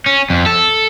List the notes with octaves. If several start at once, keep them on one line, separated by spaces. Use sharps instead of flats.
C#4
F2
A4